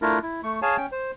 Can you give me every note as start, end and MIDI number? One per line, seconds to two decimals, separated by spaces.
0.02 0.19 57
0.02 0.19 62
0.02 0.19 64
0.02 0.19 65
0.02 0.19 70
0.23 0.41 64
0.43 0.60 57
0.43 0.60 85
0.62 0.77 68
0.62 0.77 73
0.62 0.77 77
0.62 0.77 80
0.62 0.77 81
0.78 0.86 61
0.78 0.86 79
0.92 1.11 72